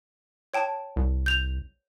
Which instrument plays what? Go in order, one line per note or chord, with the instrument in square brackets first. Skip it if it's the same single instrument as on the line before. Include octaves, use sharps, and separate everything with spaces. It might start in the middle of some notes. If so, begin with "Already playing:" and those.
[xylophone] C#5 G5 A5
[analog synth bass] C2
[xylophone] G6 F7